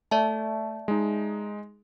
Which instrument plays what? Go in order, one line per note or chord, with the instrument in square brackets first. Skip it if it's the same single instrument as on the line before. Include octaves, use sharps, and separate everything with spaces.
[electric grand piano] A3 [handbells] D5 E5 A5
[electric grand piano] G#3 D#4